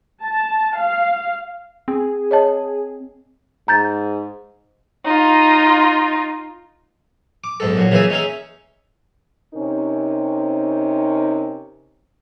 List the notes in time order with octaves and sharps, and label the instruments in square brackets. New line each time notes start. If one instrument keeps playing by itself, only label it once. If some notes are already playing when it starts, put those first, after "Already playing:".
[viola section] A5
F5
[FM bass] C4 [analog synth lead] G#4
[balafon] C#5 D#5 A5
[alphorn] G#2 [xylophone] A#5 G6 A6
[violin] D#4 F4
[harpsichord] D6
B1 G#2 A4
A#2 F#3
C#3 E3 A#3 G#4 E5 G#5
C#4 D#4 G#4 E5
[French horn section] C3 C4 C#4 D#4 A#4